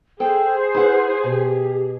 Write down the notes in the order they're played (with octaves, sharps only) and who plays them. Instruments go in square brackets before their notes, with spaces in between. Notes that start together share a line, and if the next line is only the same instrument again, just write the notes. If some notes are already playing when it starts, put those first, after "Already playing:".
[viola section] G#4 [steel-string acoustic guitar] A4 G5 [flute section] C5
[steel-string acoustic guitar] E4 F#5 [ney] B4
[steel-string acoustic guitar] B2 [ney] G4